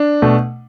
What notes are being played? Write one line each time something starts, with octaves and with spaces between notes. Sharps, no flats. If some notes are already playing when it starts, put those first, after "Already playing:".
Already playing: D4
B2 A3